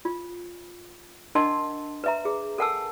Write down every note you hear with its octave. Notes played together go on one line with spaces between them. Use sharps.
F4
D4 A#4 D#5 F#5 A5 C6
B4 E5 A#5
G#4
A4 A#4 F#5 G#5 A5 E6